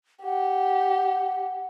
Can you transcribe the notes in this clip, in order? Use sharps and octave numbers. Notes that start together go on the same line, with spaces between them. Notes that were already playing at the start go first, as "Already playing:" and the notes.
G4 F#5